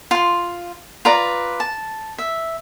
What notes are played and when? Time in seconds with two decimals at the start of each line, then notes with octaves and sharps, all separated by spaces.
0.11 F4 C6
1.05 F4 B4 D5 A#5
1.60 A5
2.18 E5